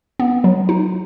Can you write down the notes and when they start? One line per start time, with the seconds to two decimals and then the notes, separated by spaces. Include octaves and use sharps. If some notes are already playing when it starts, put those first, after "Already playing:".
0.19 B3
0.44 F#3
0.69 D#4